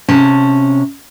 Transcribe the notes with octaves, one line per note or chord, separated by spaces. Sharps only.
C3 C#4 A5